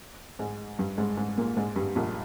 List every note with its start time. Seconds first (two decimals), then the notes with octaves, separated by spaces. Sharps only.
0.39 G#2 G#3
0.78 G2 G3
0.98 G#2 G#3
1.17 G#2 G#3
1.38 A#2 A#3
1.57 G#2 G#3
1.76 G2 G3
1.96 A#1 A#2